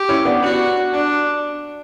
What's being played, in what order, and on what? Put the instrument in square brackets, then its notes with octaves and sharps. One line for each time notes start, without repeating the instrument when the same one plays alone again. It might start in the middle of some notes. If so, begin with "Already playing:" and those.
Already playing: [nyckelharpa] G4
[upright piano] C#4 E4
B3 D4
[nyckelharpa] F#4
D4